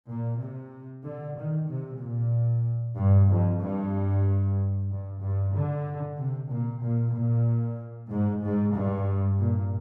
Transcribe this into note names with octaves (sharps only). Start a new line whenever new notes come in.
A#2
C3
D3
D#3
C3
A#2
G2
F2
G2
G2
G2
D3
C3
A#2
A#2
A#2
G#2
G#2
G2
A#2